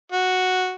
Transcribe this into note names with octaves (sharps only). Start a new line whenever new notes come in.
F#4